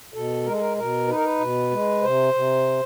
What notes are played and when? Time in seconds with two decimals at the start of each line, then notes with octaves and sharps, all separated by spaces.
0.14 B2 A4
0.45 G#3 A#4
0.52 A4
0.59 A#4
0.77 B2 A#4
1.08 D#4 B4
1.16 A#4
1.24 B4
1.40 B2
1.71 G#3
2.02 C3 C5
2.34 C3